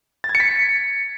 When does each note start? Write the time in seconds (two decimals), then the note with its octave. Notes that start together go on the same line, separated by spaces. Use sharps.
0.24 A6
0.29 G#6
0.35 C#7
0.40 B6